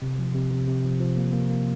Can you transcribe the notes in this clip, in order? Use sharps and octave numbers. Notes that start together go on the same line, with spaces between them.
C3
F3
C3
C3
C3
F3
F3
A#3
A#3
A#3